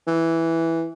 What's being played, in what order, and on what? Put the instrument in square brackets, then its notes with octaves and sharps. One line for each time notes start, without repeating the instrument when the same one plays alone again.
[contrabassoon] E3